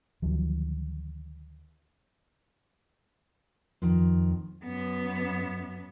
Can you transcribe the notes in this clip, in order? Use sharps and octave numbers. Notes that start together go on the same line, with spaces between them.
D2 D#3 F3 F#3
F2 D#3 F3
F#2 B3